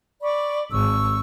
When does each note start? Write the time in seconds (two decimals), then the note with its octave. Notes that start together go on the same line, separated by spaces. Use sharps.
0.22 D5 B5 C#6
0.72 G#1 C#6 E6